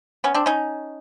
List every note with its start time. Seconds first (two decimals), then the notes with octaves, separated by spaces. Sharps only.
0.24 B3 C#4
0.34 C4 D4
0.46 C#4 D#4